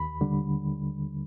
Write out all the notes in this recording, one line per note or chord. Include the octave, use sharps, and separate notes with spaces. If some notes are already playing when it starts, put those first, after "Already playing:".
Already playing: D#2 B5
D3 G3